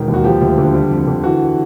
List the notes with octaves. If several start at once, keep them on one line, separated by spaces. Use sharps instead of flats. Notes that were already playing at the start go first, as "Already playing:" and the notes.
Already playing: E1 D#3
D#2
F#4
F3 G4
D2
D3
G3
F2
D3
E3 F#4